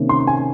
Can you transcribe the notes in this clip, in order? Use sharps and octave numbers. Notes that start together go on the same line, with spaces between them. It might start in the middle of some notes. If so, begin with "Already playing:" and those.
Already playing: C3 D#3 A#3 C#4
C6
G#5